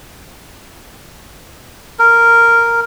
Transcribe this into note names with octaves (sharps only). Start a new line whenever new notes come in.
A#4